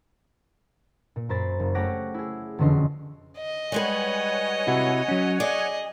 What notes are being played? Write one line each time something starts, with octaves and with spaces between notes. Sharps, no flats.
A#2
F#2 A#4 C5 B5 A6 C7
F#1
A3 G4 C#5 F#5 D6 A#6
E4 G#4
E1 F2 D3 C#4 D#5 C6
D#5
G3 G#3 B4 C#5 F#5 G#5
C3 E4 F#4
F#3 C#4
G#4 D5 D#5